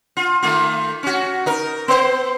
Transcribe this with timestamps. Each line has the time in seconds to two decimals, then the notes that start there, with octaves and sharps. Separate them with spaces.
0.17 F4
0.42 D#3 A3 F4
1.03 C#4 F#4
1.46 D#4 A#4
1.88 B3 C5